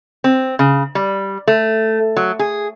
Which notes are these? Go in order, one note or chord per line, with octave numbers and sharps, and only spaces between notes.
C4
C#3
G3
A3
F#3
G#4